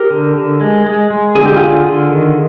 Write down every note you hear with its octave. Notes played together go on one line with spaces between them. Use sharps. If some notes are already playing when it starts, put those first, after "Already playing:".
Already playing: G4 A#4
D3
D3
G#3
G#3
G#3
D3 G#4
G4
D3 F4 G#4
D3
D#3